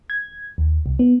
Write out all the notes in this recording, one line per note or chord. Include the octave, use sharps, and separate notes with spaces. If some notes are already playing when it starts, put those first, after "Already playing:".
G#6
D#2
C2
B3